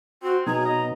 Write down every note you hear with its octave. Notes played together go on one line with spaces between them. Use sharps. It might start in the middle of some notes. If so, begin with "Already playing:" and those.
C4 F#4
B2 F#3 B3 D#4 G#4 A#5
D#5